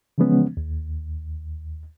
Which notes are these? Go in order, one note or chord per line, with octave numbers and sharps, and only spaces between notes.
C#3 E3 F3 G#3 B3 C#4
D#2